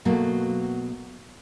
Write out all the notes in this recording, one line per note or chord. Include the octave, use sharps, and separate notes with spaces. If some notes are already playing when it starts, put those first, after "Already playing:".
B2 F#3 A3 A#3